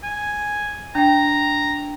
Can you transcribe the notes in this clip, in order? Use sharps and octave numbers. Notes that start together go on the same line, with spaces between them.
G#5
D4 G5 A#5